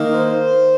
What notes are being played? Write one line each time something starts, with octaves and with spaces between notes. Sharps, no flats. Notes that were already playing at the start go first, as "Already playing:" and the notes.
Already playing: D#3 A#3 D#4
C5